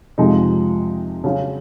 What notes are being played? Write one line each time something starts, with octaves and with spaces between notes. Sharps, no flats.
F2 C3 F3 G#3 D#4
C#3 F#3 C#4 F#4